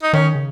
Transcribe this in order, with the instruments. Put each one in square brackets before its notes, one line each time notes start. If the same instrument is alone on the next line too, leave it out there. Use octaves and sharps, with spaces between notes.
[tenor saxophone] D#4
[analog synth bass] D#3 [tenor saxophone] C#4
[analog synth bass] C#3